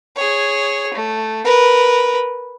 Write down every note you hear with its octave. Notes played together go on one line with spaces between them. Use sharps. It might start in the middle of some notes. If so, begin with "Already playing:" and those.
G#4 C#5
A3
A#4 B4